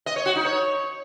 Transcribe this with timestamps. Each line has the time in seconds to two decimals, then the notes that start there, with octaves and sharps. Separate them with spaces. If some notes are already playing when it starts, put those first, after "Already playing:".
0.06 D#5
0.16 C#5
0.26 F#4
0.35 D#4
0.45 C#5